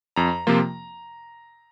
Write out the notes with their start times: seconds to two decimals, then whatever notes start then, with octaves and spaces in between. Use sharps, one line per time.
0.16 F2 A#5
0.47 C3 F3 A#3 F4